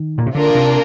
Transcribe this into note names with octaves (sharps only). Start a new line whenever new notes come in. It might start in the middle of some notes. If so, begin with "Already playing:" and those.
Already playing: D#3
A#2
C3
D3 A#3 D4 F4 A#4
C3